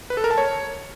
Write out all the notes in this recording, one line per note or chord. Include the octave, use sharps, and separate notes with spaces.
B4
A4
A#4
A5
C#5